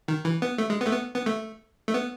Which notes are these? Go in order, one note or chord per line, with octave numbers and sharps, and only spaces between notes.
D#3
E3
B3
A3
G#3
B3
A3
B3
B3
A3
A3
B3